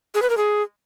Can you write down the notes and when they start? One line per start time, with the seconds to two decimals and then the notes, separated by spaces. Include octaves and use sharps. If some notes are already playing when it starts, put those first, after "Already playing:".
0.15 G#4
0.22 B4
0.30 A#4
0.37 G#4